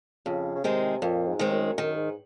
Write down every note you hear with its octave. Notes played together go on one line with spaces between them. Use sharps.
F2 C#3
C#3
C3 D#3 G#3 C4
F2 A#2
G#2
D#3 G#3 C4
F#2
F#2 D#3
G#2